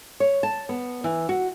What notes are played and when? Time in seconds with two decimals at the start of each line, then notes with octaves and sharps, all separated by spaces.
0.20 C#5
0.43 A5
0.69 B3
1.04 E3
1.29 F#4